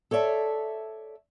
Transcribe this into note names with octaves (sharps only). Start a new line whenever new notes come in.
A4 C#5 D5 E5 A5